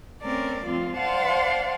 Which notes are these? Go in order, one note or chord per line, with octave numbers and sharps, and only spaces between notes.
A3 C4 C#4 A#4 D5
F3 A3 C4 F4
C5 D5 F5 F#5 A5 C6